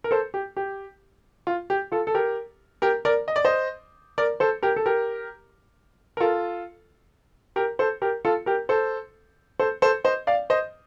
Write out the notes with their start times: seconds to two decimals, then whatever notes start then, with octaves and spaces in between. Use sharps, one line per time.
0.04 A#4
0.11 A4 C5
0.34 G4
0.57 G4
1.47 F4
1.70 G4
1.92 F4 A4
2.07 A4
2.14 G4 A#4
2.82 G4 A#4
3.05 A#4 D5
3.28 D#5
3.36 D5
3.45 C5 D#5
4.18 A#4 D5
4.40 A4 C5
4.62 G4 A#4
4.76 A4
4.86 G4 A#4
6.17 A#4
6.20 F4 A4
7.56 G4 A#4
7.79 A4 C5
8.02 G4 A#4
8.25 F4 A4
8.46 G4 A#4
8.69 A4 C5
9.59 A4 C5
9.82 A4 C5
10.04 C5 D#5
10.27 D5 F5
10.50 C5 D#5